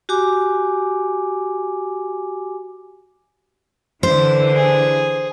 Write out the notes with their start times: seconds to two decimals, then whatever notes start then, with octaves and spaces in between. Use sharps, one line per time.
0.09 F#4 G4 G#5 D6
4.03 D3 E3 C5
4.55 G#4